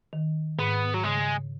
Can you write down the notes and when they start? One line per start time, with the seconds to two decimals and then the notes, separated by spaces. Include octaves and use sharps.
0.13 D#3
0.59 G#2 B3
0.94 F#3
1.04 C#3 G#3